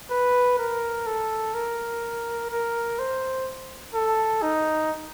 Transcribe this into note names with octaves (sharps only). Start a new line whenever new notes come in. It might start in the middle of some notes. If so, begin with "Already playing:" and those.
B4
A#4
A4
A#4
A#4
C5
A4
D#4